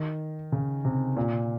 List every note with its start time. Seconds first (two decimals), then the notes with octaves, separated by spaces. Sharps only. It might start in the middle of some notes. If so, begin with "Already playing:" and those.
Already playing: D#3
0.52 C#3
0.85 C3
1.16 A#2